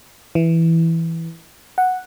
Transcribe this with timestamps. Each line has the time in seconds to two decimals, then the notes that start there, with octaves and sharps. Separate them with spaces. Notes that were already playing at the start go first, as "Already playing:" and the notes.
0.35 E3
1.78 F#5